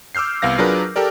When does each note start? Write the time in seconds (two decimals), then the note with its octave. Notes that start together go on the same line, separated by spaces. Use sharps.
0.15 D6 E6 F6 G6 C7
0.42 C2 B3 F5 A#6
0.58 F#3 D4 F4 G#4 A#4 B4
0.96 G4 A4 A#4 D5